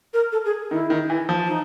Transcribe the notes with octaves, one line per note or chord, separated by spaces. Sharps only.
A#4
A4
G#4
D#3 E4
D#3
E3
F3
D#4